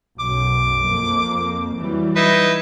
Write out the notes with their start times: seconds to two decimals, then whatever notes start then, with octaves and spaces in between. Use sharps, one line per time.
0.20 B1 F#2 D6
0.87 F2 A#3
1.77 E3 F#3 G3
2.16 D#4 E4 B4